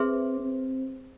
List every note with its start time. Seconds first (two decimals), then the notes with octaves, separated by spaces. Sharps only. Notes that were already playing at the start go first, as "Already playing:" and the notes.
Already playing: C4 G#4 B4 E5 C6
0.40 C4